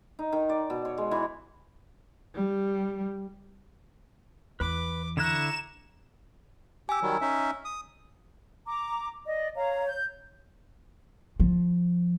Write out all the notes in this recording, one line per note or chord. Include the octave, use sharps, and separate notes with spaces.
D#4
D#3
D5
B2
C#5
G#3
E3
G3
E2 E3 B4 B5 D6
D3 E4 A#5 C#6 F#6 E7
G4 G#5 D6 E6
D#3 F#3 G3
C#4 D#4 E5
D#6
A#5 D6
D5 D#5
C#5 F5 A#5
G6
F3